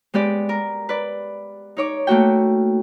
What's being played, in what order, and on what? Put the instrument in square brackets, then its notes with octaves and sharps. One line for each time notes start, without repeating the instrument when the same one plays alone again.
[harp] G#3 B3 G4 D5
A#4
B4 D5
D#4 C#5 D6
A3 A#3 F#4 G5